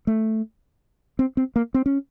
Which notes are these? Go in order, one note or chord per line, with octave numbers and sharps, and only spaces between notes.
A3
C4
C4
A#3
C4
C#4